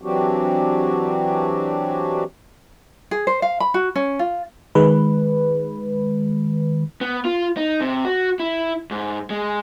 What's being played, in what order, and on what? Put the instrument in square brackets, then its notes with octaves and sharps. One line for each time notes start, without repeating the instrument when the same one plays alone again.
[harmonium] E3 F#3 C4 D4 F#4 G4
[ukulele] G#4
C5
F5
B5
F#4
C#4
F4
[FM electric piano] D#3 G#3 B4
[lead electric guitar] B3
F4
D#4
C3
F#4
E4
G#2
G#3